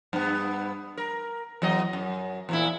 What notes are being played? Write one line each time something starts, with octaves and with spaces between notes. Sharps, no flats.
G2 B3
A#4
E2 F#3 D#5
F#2
E2 A#2 E4